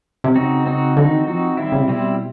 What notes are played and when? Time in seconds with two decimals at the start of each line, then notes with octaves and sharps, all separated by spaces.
0.24 C3
0.35 C#3 C4 D#4 F#4
0.66 C4 D#4 F#4
0.97 D3 C4 D#4 F#4
1.06 D#3
1.17 E3
1.27 F3 C4 D#4 F#4
1.48 E3
1.57 D#3 G3 C4 E4
1.72 C#3
1.82 C3
1.88 B2 G3 C4 E4